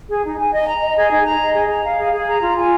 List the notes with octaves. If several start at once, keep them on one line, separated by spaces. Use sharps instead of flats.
G#4
D#4
G#5
D#5
A#5
D#5
G#4
D#4
A#5
D#5
G#4
A#5
F5
G#4
G#4
A#5
F4
G#5